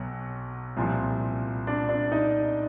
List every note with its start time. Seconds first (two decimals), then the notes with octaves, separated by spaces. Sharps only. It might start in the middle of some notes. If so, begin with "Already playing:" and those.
Already playing: B1 B2 F#3
0.77 C2 A#2 F3
1.67 D4 D5
1.89 D4 D5
2.12 D#4 D#5